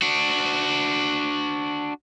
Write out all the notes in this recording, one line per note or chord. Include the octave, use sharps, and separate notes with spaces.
D4 F#4